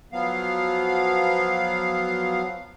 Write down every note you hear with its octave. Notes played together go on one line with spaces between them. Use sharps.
F3 F#3 B3 F5